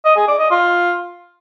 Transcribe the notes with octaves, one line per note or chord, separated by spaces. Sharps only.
D#5
G#4
D5
D#5
F4